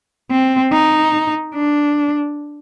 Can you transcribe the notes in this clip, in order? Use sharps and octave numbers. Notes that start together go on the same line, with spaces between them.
C4
D#4
D4